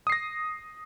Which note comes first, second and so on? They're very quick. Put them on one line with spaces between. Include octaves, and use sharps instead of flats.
D#6 C7 A#6